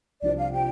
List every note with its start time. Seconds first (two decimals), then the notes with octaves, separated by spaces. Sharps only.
0.22 C2 C3 F3 D4 D5
0.37 F5
0.52 C3 F3 D4 G5